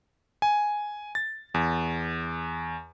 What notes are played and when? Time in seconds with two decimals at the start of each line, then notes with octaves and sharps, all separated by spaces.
0.42 G#5
1.15 A6
1.54 E2